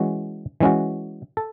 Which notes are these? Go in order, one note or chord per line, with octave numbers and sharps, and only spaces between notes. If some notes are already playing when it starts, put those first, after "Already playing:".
Already playing: E3 G#3 C#4 F#4
E3 G#3 C#4 F#4
A4